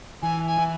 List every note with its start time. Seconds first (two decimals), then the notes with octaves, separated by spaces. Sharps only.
0.22 E3 G#5
0.47 G#5
0.59 E3